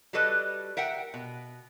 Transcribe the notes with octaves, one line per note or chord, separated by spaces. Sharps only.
G3 F#4 A4 B4 D#5 A5
A#4 E5 F#5 G5
B2